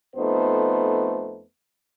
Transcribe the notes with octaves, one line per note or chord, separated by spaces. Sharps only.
F2 A3 B3 D#4 C5